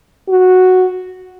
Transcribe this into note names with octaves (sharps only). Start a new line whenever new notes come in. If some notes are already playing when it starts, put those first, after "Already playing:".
F#4